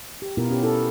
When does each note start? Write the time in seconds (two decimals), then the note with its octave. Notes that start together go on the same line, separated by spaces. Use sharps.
0.22 G4
0.37 B2 B3 E4 F4 A#4
0.49 C#4 G4
0.63 E4 A4